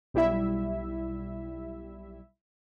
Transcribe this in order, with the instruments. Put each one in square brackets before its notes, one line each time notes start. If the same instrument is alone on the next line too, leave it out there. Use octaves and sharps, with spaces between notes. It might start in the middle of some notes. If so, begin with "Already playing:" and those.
[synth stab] B1 G3 E4 E5